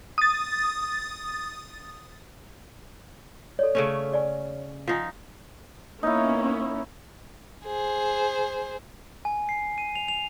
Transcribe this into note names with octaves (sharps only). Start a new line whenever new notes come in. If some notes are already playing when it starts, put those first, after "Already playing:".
D#6 A6
A4 C#5 D5
C#3 A3 C#4
G#4 D5 G#5
F3 D#4 F#5 G#5
A#3 B3 C#4 D#4 E4
G#4 C5
G#5
C7
D#7
F7
F7